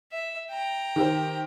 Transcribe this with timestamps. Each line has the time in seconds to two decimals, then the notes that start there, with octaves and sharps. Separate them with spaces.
0.12 E5
0.50 G5 A#5
0.96 D#3 G4 C5